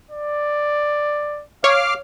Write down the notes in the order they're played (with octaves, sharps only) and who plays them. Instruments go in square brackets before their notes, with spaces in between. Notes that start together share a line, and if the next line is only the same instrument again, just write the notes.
[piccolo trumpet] D5
[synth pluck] C#5 [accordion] F5 D6 F6